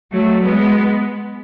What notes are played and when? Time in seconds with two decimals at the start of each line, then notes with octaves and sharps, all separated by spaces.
0.12 F#3 A3
0.42 G#3 B3